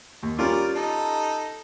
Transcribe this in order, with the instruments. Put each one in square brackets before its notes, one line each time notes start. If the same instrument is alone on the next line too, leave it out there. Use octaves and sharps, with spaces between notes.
[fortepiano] D#2
[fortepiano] G3 C#4 F4 [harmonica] A#4 D5
[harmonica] D#4 A4